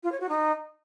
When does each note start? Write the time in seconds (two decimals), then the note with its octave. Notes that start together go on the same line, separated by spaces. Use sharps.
0.03 F4
0.12 C#5
0.20 F#4
0.29 D#4